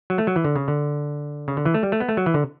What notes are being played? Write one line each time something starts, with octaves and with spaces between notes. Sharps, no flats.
F#3
A3
F#3
E3
D3
C#3
D3
C#3
D3
E3
A3
G3
A3
B3
A3
F#3
E3
D3